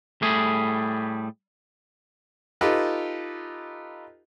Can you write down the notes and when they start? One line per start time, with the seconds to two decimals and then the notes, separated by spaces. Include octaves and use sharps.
0.22 A2 G3 A3 G#4
2.61 D#4 F4 G4 A4 B4